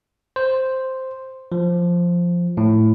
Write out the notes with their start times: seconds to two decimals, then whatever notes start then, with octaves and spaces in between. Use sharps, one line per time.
0.36 C5
1.52 F3
2.57 A2